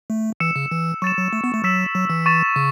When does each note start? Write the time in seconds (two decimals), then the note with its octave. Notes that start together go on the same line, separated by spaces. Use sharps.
0.10 A3
0.40 E3 E6 C#7 E7
0.56 C#3
0.71 E3
1.02 F#3 C#6 A6 E7
1.18 F#3
1.33 A3
1.44 B3
1.54 A3
1.64 F#3 E6 B6 E7
1.95 F#3
2.10 E3
2.26 C#6 A6 E7
2.56 C#3